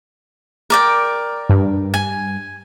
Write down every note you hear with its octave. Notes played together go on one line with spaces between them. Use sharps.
A#4 D5 G5
G2
G#5